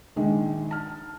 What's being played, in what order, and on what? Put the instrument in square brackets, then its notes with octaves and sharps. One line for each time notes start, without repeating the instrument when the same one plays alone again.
[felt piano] A#1 D#3 G#3
A5 F6